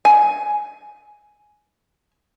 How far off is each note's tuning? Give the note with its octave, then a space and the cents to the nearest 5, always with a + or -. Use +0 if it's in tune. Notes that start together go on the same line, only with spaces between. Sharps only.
G#5 +10